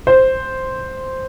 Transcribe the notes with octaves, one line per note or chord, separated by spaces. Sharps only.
C5